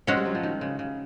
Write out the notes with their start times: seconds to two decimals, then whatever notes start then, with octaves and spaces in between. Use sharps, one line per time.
0.07 G#3 C4 C#4 F#4
0.17 G3
0.25 F#3
0.35 F3
0.43 D#3
0.61 C#3
0.79 C#3